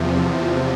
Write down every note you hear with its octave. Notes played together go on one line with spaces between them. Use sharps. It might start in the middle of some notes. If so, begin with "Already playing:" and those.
Already playing: E2 C3 F3